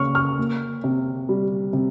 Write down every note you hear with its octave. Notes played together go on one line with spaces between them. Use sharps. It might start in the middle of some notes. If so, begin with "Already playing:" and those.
Already playing: C#3 A#3 C#6 F6
C#6 F6
A#3
C3
G3
C3